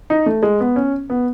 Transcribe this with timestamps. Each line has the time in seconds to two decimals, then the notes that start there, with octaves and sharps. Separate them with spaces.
0.10 D#4
0.26 A3
0.43 G#3
0.60 B3
0.76 C#4
1.10 B3